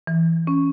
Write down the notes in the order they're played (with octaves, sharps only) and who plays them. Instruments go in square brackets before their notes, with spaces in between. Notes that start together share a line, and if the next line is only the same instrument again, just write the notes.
[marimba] E3
C#4